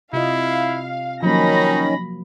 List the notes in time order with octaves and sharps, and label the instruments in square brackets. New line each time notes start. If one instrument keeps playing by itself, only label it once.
[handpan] C3 F4 D#5 [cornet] E4 [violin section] F5
[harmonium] D#3 C#4 [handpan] F3 F#3 A#3 [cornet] D#4 [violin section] B5 A#6